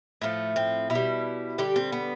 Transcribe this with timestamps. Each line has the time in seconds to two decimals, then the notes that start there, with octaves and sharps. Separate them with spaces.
0.22 A2 F3 A3
0.56 C4
0.90 B2 E4
0.95 G3
1.58 D3 G3 G4
1.76 C4
1.92 B3